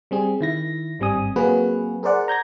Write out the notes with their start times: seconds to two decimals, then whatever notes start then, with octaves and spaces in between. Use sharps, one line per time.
0.11 G3 C4 G#4
0.41 D#3 E4 A#6
0.99 G#1 G2 G3 C4 G#5 D#6
1.36 F#3 A#3 C4 F#4 G#4 B4
2.03 G#4 A#4 C5 D5 F#5
2.28 A#5 G6 G#6 A#6